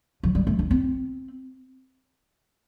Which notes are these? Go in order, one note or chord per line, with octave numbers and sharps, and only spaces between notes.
F3
G3
A3
D4
C4